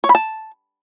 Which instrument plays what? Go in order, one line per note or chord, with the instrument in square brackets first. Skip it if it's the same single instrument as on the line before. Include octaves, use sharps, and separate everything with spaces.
[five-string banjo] C#5
B5
A5